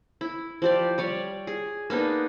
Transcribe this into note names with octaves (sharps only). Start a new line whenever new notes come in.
E4
F3 G4 D5
G3 C#5 D5
G#4
A#3 B3 D4 D#4